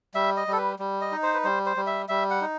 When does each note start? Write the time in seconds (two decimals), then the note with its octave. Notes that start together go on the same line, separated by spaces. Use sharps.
0.14 G3 E5
0.37 D#5
0.47 G3
0.53 A4
0.57 B4
0.79 G3
1.01 D#5
1.12 D#4
1.23 C5
1.34 B4
1.44 G3 C5
1.66 C5
1.77 G3
1.87 E5
2.09 G3 E5
2.30 F#5
2.41 D#4